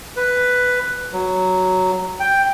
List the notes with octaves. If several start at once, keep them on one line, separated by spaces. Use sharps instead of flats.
B4
F#3
G5